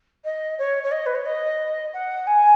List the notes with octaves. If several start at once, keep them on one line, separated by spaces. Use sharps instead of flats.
D#5
C#5
C#5
D#5
B4
C#5
D#5
F#5
G#5